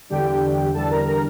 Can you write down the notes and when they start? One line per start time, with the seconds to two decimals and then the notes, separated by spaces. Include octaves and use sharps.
0.09 E2 D3 G3 D4 G4 G5
0.74 E2 D3 G3 D4 A4 A5
0.90 A#4 A#5
1.07 A#4 A#5